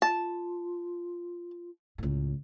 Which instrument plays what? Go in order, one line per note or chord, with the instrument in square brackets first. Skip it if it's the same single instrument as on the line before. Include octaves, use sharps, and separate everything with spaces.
[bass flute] F4 [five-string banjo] A5
[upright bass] C#2 A2